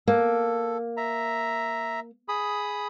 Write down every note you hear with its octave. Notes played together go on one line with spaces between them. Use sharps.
A#3 A4
E5 A#5
G#4 B5 D#6